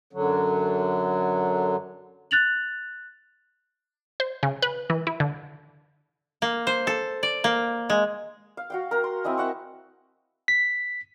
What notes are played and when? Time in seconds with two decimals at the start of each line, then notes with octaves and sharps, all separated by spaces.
0.13 F#2 D3 F#3
2.31 F#6 A6 F7 F#7
4.20 C5
4.43 C#3
4.62 B4
4.90 E3
5.07 E4
5.20 D3
6.42 A#3
6.67 C5
6.87 A4
7.23 D5
7.44 A#3
7.90 G#3
8.57 F5
8.70 F#4 F5 G5
8.91 A#4 A#5
9.04 C6
9.24 C4 E4 D#5 G#5
9.38 E5 F#5 C#6
10.48 B6